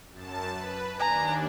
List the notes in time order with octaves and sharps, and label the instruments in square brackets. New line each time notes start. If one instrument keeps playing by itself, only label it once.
[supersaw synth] F#2 A5
B4
[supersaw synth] D#2 D4 [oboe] G#5 [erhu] A#5